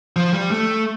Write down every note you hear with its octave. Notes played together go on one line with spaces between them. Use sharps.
F3
G3
A3